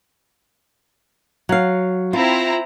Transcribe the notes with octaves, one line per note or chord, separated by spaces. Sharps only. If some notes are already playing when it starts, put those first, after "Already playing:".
F#3 F5
C4 E4 F4 A#5